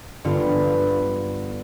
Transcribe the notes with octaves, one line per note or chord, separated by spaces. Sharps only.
G2 D3 B3 F4